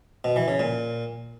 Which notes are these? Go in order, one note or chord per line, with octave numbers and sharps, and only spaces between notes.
B2
E3
C#3
A#2